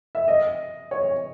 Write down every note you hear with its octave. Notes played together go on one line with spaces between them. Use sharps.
E5
D#5
C#5